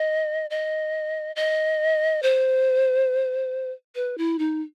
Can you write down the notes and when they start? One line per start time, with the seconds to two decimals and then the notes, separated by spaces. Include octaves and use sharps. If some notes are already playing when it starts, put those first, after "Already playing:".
Already playing: D#5
0.50 D#5
1.36 D#5
2.23 C5
3.95 B4
4.18 E4
4.39 D#4